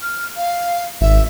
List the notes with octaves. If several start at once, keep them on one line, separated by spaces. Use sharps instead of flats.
F6
F5
G#1 E5